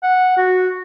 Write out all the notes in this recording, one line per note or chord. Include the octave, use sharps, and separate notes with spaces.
F#5
F#4